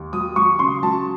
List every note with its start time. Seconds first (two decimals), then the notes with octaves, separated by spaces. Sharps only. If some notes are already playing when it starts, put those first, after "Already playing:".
Already playing: D#2
0.13 F#3 D#6
0.36 F#3 C#6
0.59 C#3 C6
0.83 F#3 A5